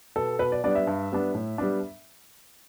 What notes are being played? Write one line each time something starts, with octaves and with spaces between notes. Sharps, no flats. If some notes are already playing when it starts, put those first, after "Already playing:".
B2 B3 A4
B2 B4
D5
G3 B3 D4 D5
E5
G2
G3 B3 D4
A2
G3 B3 D4